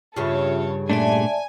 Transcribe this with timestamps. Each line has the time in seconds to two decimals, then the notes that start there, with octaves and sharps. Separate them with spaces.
0.16 G2 C#3 F4 A4 C#5 E5
0.90 A#2 A3 D4 D5 E5 G#5 A5